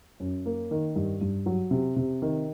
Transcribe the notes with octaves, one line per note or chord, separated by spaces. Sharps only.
F#2
A#3
D#3
G2
G2
F#3
C3
C3
D#3